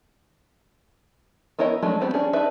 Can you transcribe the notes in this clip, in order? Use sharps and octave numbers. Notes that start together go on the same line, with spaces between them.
B3 E4 A#4 C#5 D#5
F#3 G#3 A3 C#4 D4
G3 B3 C4
C#4 D4 G#4
D4 D#4 B4 E5